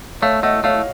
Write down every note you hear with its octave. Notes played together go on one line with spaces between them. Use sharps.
A3 C#5 F5
A3 D#5 F#5
A3 C#5 F5